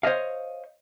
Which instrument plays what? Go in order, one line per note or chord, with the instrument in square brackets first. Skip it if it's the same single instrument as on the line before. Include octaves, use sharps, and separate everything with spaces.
[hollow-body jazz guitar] C5 C#5 D#5 F5